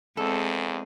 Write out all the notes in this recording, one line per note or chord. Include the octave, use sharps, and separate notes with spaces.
E2 G#3 C4 A4